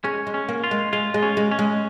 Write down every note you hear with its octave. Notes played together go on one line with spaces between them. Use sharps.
G#3 C#4
G#3
C#4
A#3
F4
G#3
G#3 F4
G#3
C#4
G#3
C#4
G#3